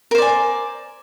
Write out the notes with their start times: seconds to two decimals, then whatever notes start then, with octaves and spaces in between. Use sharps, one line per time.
0.11 A#4
0.15 C5
0.18 D5
0.22 G#5